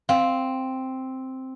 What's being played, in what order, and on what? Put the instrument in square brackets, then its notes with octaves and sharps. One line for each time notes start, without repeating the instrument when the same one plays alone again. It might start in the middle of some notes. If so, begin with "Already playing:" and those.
[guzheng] C4 [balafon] F5